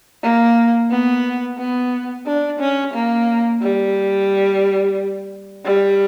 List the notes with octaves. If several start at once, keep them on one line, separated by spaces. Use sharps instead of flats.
A#3
B3
B3
D4
C#4
A#3
G3
G3